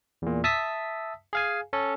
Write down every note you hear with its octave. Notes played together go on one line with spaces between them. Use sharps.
E2 A#2
E5 A5 D#6 E6 B6
G#4 F5 G#5
C#4 A4